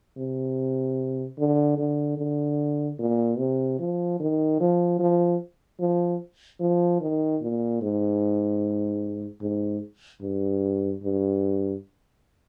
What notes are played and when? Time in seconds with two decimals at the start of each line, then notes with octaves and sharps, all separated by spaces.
0.17 C3
1.39 D3
1.78 D3
2.18 D3
2.99 A#2
3.38 C3
3.80 F3
4.20 D#3
4.60 F3
5.00 F3
5.80 F3
6.60 F3
7.01 D#3
7.42 A#2
7.82 G#2
9.42 G#2
10.22 G2
11.03 G2